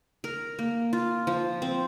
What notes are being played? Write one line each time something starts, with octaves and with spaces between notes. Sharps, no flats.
A#4
A#3
F4
F3
C4